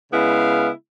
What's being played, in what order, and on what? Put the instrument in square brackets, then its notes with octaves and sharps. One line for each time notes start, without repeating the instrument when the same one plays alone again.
[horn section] C#3 G#3 B3 E4 F5